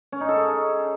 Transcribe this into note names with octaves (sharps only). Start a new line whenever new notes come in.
C#4
D#4
A4
G#4